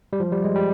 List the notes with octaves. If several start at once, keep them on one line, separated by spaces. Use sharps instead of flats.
G3
F3
G3
G#3
G3